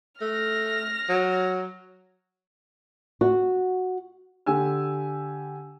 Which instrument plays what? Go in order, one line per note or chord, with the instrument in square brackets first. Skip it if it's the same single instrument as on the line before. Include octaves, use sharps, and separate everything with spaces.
[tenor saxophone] A3 [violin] F6 A#6
[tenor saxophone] F#3
[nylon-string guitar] F#4
[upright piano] D3 G4 G#5 E6